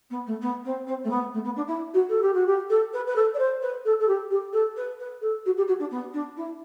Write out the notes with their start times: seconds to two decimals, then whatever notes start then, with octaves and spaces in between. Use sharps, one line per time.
0.10 B3
0.26 A3
0.41 B3
0.64 C4
0.86 C4
1.03 A3
1.10 B3
1.33 A3
1.44 B3
1.56 D4
1.67 E4
1.93 F#4
2.09 A4
2.21 G4
2.34 F#4
2.46 G4
2.69 A4
2.93 B4
3.06 B4
3.15 A4
3.34 D5
3.38 C5
3.62 B4
3.85 A4
3.99 A4
4.07 G4
4.30 G4
4.52 A4
4.76 B4
4.99 B4
5.21 A4
5.45 F#4
5.56 G4
5.67 F#4
5.79 D4
5.90 B3
6.13 D4
6.36 E4